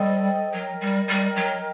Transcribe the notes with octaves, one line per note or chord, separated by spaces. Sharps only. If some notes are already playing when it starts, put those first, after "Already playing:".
Already playing: G3 A4 C5 D#5 G5
F#3 A#4 D#5 G5
G3
G3
F#3